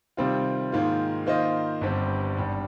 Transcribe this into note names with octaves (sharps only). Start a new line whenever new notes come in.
C3 D#3 G3 C4 F4
G#2 D#3 A#3 F4
D#3 A#3 F4 C5 D#5
G1 G2 G3 C4 G4
G#1 G2 G3